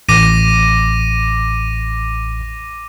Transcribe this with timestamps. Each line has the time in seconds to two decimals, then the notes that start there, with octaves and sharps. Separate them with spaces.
0.09 A1 D6 A#6 D#7